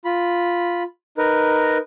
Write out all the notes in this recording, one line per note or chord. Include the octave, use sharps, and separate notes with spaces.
F4 B5
D#4 A#4 B4